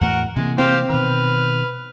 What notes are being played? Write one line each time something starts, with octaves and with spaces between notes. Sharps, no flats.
E2 A2 F#4 A#4 F#5
C3 E3 G#3 A#3
C4 G4 C5 F5
B2 D#3 B4 F6